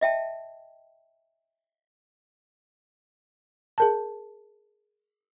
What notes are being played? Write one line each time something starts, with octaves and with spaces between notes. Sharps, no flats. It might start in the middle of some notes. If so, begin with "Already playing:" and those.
D#5 E5 G5 A5
G#4 A#4 A5